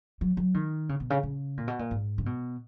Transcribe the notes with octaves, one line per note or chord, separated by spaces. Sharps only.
F#3
F#3
D#3
C#3
B2
C#3
C#3
A#2
B2
A#2
G#2
C#3
B2